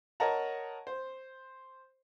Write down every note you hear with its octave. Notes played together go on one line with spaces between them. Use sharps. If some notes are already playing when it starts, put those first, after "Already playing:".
A#4 C#5 D#5 F#5 A5 A#5
C5